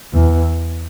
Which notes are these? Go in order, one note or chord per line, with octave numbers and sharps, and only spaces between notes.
E2